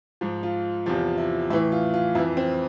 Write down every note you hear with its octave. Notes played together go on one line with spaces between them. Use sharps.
G#2 F3
F4
E2 C3 F3 F4
E4
A2 E3 E4
F4
F4
F2 E3 E4
C4